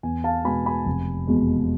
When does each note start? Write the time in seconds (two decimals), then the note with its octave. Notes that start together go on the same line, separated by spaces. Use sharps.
0.03 E2 G#5
0.24 F5 A5
0.45 B2 G#3 G#5 B5
0.66 G#5 B5
0.86 F1
1.27 E2 B2 G#3